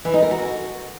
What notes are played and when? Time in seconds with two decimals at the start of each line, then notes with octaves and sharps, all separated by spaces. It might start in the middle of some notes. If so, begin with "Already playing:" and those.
0.05 E3
0.14 D#4
0.22 A#4
0.31 F#4